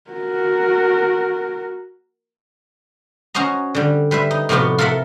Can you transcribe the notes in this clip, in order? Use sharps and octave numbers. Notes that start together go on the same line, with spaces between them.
F#4 A#4
C#4 F#4 C5 D#5 A#5
D3 G3
G3 B4 C5 E5
D#4
A2 C3 F3 B3 F4 F#4
F4 A4 A#4 E5 F#5